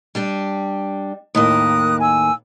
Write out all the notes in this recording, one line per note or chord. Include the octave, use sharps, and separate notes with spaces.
G3 D4 G4
D#2 A2 A#3 A#4 D#6 F#6
G#5 E6